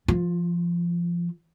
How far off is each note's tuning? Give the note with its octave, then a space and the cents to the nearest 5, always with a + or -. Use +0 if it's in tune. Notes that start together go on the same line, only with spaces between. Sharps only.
F3 -20 F4 +15